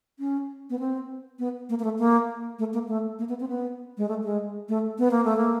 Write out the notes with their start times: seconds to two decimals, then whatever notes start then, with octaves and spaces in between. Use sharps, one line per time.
0.19 C#4
0.70 B3
0.79 C4
1.39 B3
1.69 A#3
1.79 A#3
1.84 A3
1.99 A#3
2.59 A3
2.74 A#3
2.88 A3
3.19 A#3
3.29 B3
3.40 C4
3.48 B3
3.98 G#3
4.09 A3
4.24 G#3
4.69 A3
4.99 B3
5.11 A#3
5.25 A3
5.37 A#3